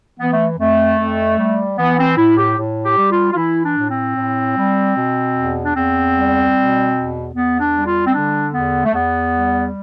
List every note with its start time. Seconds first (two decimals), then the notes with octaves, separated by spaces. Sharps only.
0.19 E3 B3
0.32 A3
0.58 F2 A3
0.98 F2
1.38 G3
1.78 E3 B3
1.97 C4
2.17 A2 E4
2.38 G4
2.58 A2
2.84 G4
2.97 G3
3.11 F4
3.31 F4
3.36 E3 E4
3.64 D4
3.77 A2
3.90 C4
4.16 A2
4.56 G3
4.96 B2
5.35 E2
5.64 D4
5.75 E2 C4
6.14 G3
6.55 B2
6.94 E2
7.34 E2 B3
7.60 D4
7.74 G3
7.87 F4
8.07 C4
8.13 D3 D4
8.53 E2 B3
8.85 A3
8.93 E2 B3
9.33 G3